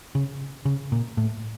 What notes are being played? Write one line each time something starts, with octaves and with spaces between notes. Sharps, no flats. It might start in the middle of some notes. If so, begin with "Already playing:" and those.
C#3
C#3
A#2
A2